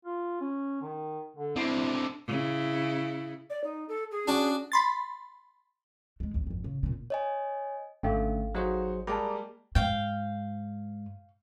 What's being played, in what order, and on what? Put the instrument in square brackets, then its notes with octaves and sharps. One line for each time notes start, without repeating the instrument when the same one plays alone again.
[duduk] F4
C#4
D#3
D3
[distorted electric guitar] D3 C4 [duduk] E4
[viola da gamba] C#3 E4
[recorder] D5
D#4
A4
G#4
[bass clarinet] C#4 [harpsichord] D4 F#4 D5
[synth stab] B5 C6 A6
[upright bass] G#3 A3
G#1 E2
G#1 F2
C#3
A#2 C#3
[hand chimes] C#5 D#5 G#5
[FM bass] G#1 [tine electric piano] D3 A3 C#4 [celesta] A4 F5 G5
[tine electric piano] F#3 G#4 C5 [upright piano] D#4 F#4
[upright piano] G3 G#3 A#3 [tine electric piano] D5 A#5 [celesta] A5 D6
[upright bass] G#2 [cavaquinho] F5 G5